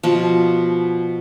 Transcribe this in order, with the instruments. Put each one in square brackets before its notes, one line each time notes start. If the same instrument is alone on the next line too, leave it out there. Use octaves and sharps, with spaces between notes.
[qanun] B2 F3